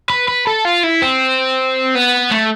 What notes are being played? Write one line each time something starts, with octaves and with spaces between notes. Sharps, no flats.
B4
B4
A4
F4
E4
C4
B3
A3